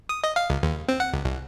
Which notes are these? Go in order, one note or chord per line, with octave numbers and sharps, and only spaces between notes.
D#6
D#5
F5
C#2
D#2
C4
F#5
C#2
C2